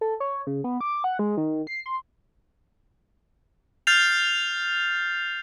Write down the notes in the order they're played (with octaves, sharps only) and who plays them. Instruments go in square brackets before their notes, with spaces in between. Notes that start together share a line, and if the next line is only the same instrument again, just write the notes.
[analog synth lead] A4
C#5
C#3
B3
D6
F#5
G#3
D#3
C7
C6
[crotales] F6 G6 A6 C7 F7